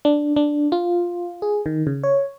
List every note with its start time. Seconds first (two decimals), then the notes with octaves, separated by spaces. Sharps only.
0.05 D4
0.36 D4
0.72 F4
1.42 G#4
1.66 D#3
1.87 C#3
2.04 C#5